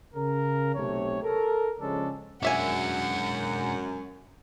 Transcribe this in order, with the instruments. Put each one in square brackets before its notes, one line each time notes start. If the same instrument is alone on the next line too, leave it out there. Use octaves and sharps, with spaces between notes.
[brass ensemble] C#3 A#4
B1 C3 A3 G4 C#5
A4 A#4
C#3 F3 G#3 C#4 D4 A4
[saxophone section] F#2 [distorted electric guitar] G#3 D4 [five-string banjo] A#3 E5 G#5 [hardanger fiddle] F#5